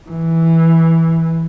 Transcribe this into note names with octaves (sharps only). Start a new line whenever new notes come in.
E3